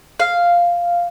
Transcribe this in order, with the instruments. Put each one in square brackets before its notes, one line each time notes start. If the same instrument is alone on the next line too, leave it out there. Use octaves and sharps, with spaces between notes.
[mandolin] F5